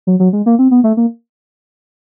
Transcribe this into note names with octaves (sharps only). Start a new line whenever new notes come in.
F#3
F#3
G#3
A#3
C4
B3
A3
A#3